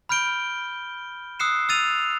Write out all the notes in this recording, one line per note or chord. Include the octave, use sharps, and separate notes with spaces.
B5 F6 G6 D7 G7
D#6 E6 F#6 C7 C#7 E7
E6 F6 A6 D#7 F7